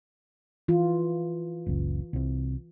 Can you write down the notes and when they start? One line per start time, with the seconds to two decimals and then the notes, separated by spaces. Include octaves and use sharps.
0.68 E3 F4
1.66 F#1 C#2
2.13 C2 C3